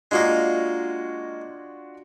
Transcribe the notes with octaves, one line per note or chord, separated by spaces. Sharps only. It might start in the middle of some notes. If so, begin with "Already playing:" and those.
G#3 A#3 D4 D#4 F4 F#4